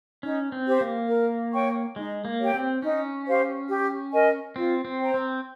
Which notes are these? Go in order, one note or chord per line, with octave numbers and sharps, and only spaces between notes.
C#4 D#4
C4
G4 C5
A#3
A#4
C#5 G5 C#6
G#3 D#4
A#3
G4 C#5 G5
C4
C#4 D#4
G4 C5 F5
G4
A#4 D#5 G#5
C4 F4
C4
C5 G5 A#5
C4